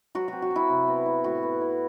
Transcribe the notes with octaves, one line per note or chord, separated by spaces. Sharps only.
F#3 F#4
C4 F#4
F#4
F#3 E4
C3
B3
E4
A2 F#4
B3
E4